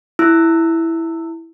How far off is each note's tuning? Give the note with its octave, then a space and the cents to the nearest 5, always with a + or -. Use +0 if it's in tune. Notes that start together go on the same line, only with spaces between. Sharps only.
E4 +0 E6 +0